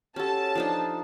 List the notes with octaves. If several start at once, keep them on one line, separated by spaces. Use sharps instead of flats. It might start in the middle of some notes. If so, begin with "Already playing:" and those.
C#4 F#4 G4 A4 F#5 A5
F3 D4 D#4 F4 F6